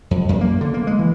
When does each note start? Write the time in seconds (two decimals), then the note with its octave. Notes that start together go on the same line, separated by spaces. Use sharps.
0.11 F2
0.29 F#2
0.41 A#3
0.61 D3
0.74 A#3
0.87 G#3
0.99 E3